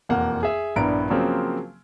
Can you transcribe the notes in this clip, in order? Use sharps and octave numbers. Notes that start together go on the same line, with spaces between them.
E1 F2 A#3 F#5
G#4 E5
A#1 G2 B3 E4 A#5 D7
C#3 F3 F#3 A#3 C4